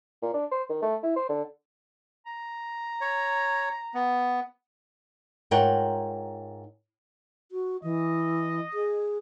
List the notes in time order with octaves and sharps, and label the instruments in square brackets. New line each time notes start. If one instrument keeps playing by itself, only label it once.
[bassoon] A#2
D4
C5
D#3
A3
E4
C5
D3
[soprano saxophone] A#5
[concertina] C#5
B3
[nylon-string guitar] G#2 F4 A#4 C#5 F#5 G5
[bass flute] F#4
[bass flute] E3 [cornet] D#5
[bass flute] G#4